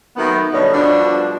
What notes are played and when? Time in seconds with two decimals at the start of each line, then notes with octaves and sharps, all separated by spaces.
0.16 D#3 F#3 A3 B3
0.51 B2 D3 G3 B3 C#5 D#5
0.73 B2 F3 G3 D4